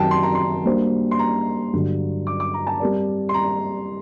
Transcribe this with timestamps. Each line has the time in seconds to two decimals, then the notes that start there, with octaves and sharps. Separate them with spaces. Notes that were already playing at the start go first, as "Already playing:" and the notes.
Already playing: F#2 D#3 F#3 C4 G4 G5 A5
0.11 C6
0.23 A#5
0.35 C6
0.65 G3 A#3 D4 F#4 C5
1.11 C6
1.19 A#5
1.73 G2 D3 F#3
2.27 D6
2.40 D6
2.54 A#5
2.67 A5
2.80 G3 C4 G4 A#4 D5
3.29 C6
3.34 A#5